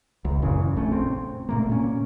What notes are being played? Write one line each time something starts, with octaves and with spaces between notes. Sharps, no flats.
C#2
F#2 A#2 C#3 E3
A#1 A3 C#4
C4
A#2 A3 A#3
A#2 C#4